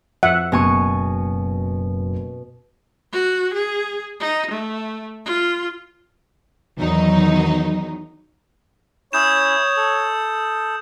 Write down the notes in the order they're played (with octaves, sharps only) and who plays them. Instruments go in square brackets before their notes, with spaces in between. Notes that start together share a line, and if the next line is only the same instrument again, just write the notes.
[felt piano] F2 [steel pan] E5 F#5
[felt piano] F#1 [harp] B2 G#5 C#6
[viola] F#4
G#4
D#4
A3
F4
[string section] E2 D#3 F#3 D#4
[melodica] C#4 E4 [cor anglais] C#5 [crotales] D#6 G6 E7
[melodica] A4